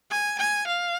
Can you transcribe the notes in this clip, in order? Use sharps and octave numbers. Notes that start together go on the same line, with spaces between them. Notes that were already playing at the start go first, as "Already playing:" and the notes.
G#5
G#5
F5